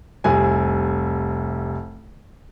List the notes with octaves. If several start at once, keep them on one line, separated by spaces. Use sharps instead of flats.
F1 C2 G#5